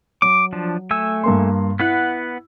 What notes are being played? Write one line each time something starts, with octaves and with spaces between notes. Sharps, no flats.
F#3 D6
F3 D4
A3 G#5 E6
G2 A#3 C6
B3 E4 B4 F#5